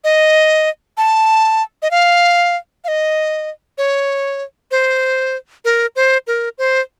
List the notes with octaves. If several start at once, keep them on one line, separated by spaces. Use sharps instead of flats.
D#5
A5
D#5
F5
F5
D#5
C#5
C5
A#4
C5
A#4
C5